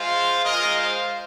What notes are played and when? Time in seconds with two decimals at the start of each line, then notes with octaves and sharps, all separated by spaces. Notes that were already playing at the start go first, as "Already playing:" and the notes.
Already playing: G#3 F4 C5 F5
0.44 G#3 F4 A#4 D#5
0.75 C5 F5